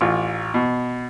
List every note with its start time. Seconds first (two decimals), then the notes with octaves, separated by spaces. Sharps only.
0.01 A1 F4
0.54 B2